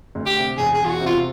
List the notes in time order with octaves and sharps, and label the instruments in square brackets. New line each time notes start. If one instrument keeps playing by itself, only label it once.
[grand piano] D2
[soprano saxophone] G4
[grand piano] C3
[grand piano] E1 [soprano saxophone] G#4
[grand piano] E1 [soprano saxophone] G#4
[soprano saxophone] F4
F#4
[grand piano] C3
[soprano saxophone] F4